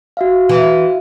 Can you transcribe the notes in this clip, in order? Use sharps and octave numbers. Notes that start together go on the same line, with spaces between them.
F#4 E5 F5
E3